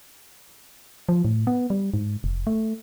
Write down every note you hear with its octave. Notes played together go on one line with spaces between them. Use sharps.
F3
A2
B3
G3
G#2
F1
A3